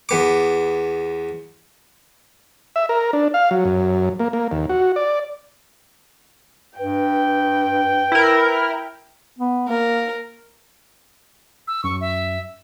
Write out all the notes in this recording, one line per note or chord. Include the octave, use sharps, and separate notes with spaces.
E2 B3 D6
E5
A#4
D4
F5
F#3
F#2
A#3
A#3
D#2
F#4
D5
G2 B4 G5
E4 A#4
B3
A#3 A#4
E6
F#2 C#6
E5